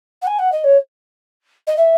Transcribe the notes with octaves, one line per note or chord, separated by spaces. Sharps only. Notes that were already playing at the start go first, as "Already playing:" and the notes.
F#5
G#5
F#5
D#5
C#5
D#5
E5